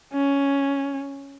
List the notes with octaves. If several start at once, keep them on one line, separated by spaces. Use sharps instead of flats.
C#4